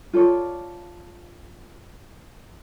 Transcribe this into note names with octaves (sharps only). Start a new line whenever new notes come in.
F4 A4 C#5 D5